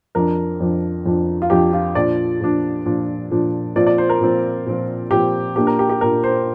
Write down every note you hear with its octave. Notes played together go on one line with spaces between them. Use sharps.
F2 F3 D4 A#4
F2 F3 D4
F2 F3 D4
F4
F2 F3 D4 G4
F4
A#2 F3 D4 D5
A#2 F3 D4
A#2 F3 D4
A#2 F3 D4
A#2 F3 C4 D5
D5
C5
A#4
A#2 F3 C4
A#2 F3 C4
A#2 F3 C4 G4
A#2 A#3 D4 G4
A#4
G4
G4
A#2 A#3 D4 A#4
C5